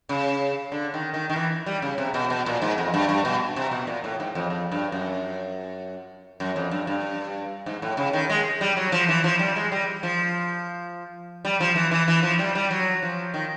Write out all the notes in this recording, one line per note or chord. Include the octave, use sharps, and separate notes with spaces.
C#3
D3
D#3
D#3
D#3
E3
G3
C#3
C3
B2
B2
A#2
G#2
F2
G2
G2
B2
C3
B2
A#2
A2
G#2
F2
F2
G2
F#2
F#2
F2
G2
G2
G#2
A2
C#3
D#3
G#3
G3
F#3
F3
E3
F3
G3
G#3
G3
F3
G3
F3
E3
E3
E3
F3
G3
G3
F#3
F3
D#3